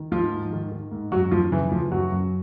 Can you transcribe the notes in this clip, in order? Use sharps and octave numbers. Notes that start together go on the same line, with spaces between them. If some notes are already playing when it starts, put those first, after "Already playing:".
Already playing: D#3
G#2 F3 F4
G#2
D#3
D#3
G#2
F#2 F#3 F#4
F#2 F3 F4
C#3 E3 E4
E3 F3 F4
F#2 F#3 F#4
F#2